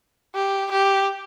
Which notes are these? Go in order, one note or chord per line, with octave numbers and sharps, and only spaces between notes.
G4
G4